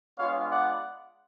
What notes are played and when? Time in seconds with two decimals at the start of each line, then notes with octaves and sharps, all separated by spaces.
0.18 G#3 B3 D4 F4 C#5 F5
0.50 D5 F#5